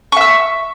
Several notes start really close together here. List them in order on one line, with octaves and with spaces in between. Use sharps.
C#6 E5 E6